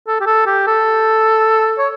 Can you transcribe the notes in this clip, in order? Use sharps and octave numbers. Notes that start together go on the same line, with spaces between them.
A4
G4
A4
G4
A4
C#5